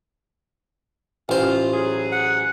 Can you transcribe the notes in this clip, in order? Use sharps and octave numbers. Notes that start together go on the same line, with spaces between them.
A1 F4 C5
F#3 G#4
F#5